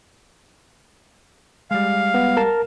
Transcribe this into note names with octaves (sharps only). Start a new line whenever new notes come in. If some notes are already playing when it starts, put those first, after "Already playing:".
G3 G#3 F5
B3
A#4 A5